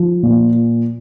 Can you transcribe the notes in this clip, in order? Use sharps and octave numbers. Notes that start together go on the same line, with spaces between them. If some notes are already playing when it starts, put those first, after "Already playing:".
Already playing: F3
A#2